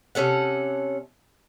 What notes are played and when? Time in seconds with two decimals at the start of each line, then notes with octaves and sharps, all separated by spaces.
0.15 C3 C#4 A4 F#5